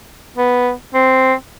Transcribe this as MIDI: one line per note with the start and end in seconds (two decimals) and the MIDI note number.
0.37 0.71 59
0.94 1.34 60